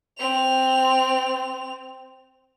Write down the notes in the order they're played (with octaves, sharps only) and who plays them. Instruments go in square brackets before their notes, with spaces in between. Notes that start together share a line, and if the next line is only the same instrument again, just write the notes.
[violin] C4 F7